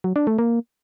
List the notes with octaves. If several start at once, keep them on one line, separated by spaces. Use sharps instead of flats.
F#3
D4
A3
A#3